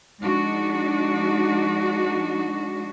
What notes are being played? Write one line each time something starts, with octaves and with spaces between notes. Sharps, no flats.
F3 G#3 D4 D#4 F#4